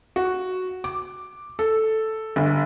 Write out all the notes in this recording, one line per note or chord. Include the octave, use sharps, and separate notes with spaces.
F#4
D6
A4
G1